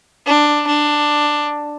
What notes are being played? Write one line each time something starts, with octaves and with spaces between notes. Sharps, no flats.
D4
D4